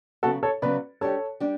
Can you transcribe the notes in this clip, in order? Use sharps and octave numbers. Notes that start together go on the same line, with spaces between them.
C#3 F#3 B3 F#4 A4
A4 C#5
C#3 F#3 B3 B4 D5
G3 D4 G4 A4 C#5
G3 D4 G4